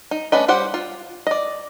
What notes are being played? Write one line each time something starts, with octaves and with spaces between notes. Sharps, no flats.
D#4
A3 C#4 D4 B4 D#5
G3 G4 C5 F#5
F4
D5 D#5